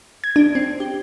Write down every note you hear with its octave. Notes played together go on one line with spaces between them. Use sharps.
G#6
D4
C4
G4